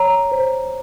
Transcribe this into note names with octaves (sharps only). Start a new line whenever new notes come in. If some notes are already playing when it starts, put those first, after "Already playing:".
Already playing: C#5 A#5
C5